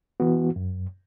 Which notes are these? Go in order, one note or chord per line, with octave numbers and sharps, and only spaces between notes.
E3 B3 F#4
F#2